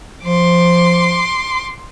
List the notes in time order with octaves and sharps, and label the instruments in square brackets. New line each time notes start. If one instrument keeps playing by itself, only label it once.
[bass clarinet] F3 [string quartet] C6 D6